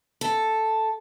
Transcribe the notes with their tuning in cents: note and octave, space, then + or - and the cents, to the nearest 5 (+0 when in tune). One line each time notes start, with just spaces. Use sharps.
A4 +0